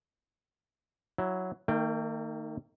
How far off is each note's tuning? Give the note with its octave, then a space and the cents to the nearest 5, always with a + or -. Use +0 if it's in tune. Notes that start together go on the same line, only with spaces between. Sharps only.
F#3 +0 E4 +0
D#3 +0 A#3 -45 G5 +0